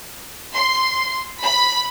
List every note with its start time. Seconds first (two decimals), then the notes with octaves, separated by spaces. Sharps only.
0.54 C6
1.42 B5